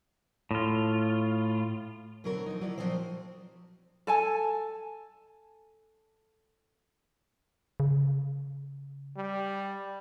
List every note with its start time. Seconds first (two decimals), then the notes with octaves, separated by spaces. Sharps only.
0.51 A2 F4
2.24 B2 D3 F#3 C4 A#4
2.46 F3 D#4
2.61 F#3 A#3 E4 D5
2.78 A#2 F3 F#3 C4 C5
4.07 A4 G#5 A5
7.80 C#3
9.17 G3